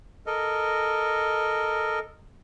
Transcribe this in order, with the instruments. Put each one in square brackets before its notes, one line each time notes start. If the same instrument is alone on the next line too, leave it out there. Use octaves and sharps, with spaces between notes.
[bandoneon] A4 A#4 D#5